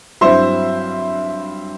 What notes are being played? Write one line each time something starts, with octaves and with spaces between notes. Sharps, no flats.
G2 F#3 C4 E4 C5 E5